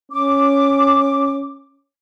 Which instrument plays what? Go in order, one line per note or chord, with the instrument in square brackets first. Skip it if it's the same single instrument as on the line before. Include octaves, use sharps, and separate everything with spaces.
[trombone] C#4 [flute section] D6